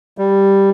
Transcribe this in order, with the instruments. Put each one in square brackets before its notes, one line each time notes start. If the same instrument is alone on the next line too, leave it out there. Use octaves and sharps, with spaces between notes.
[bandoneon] G3